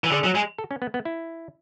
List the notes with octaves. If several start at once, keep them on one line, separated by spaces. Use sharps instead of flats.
E3
D3 G#4
F#3
G#3
A4
C#4
B3
B3
E4